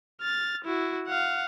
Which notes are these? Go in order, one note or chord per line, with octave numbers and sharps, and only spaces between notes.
F6 A6
E4 F#4
F5 F#5